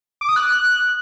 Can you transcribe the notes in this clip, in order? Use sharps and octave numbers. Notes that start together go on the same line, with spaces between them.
D6
D#6
F#6